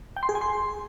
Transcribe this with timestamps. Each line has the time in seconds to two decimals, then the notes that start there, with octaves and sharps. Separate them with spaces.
0.16 G5
0.23 C6
0.29 G#4
0.35 G#5
0.41 C6